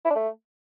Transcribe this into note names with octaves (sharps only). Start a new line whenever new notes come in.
E4
D4
A3